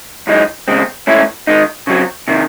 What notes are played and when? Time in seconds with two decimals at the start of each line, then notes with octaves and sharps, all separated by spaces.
0.27 F#2 E3 G#3 D#4
0.68 E2 C#3 G#3 C4
1.07 G#2 E3 A3 C#4 E4
1.47 D#3 G#3 D#4
1.87 C#3 F#3 C4
2.28 C3 D#3